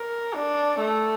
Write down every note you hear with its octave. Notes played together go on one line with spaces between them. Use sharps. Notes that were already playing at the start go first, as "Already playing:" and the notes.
Already playing: A#4
D4
A3